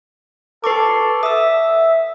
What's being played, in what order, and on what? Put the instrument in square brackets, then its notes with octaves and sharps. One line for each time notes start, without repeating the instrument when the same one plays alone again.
[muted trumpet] A4 [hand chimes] B4 C#6 D6
[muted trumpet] E5 [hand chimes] D#6 E6